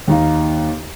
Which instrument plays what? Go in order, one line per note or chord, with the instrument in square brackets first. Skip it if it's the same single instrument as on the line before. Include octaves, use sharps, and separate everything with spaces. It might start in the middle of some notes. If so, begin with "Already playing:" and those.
[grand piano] D#2 D#4 F5